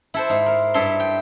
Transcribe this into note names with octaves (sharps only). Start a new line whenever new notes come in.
E4 A4 C5
G#2
A#4
G2 E4 A4 C6
G5